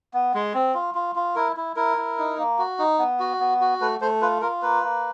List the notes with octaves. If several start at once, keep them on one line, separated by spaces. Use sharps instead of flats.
B3
G#3
C4
F4
F4
F4
E4 A#4
E4
E4 A#4
E4
D#4
A#3
F#4
D#4
B3
F#4
B3
F#4
A3 B4
A3 C5
F4 B4
F4 A#4
A#3 B4
A#3